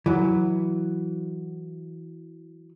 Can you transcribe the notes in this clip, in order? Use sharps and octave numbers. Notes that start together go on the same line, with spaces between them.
E3 F#3